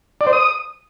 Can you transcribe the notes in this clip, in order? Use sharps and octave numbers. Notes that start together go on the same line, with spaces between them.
D5
C5
D#6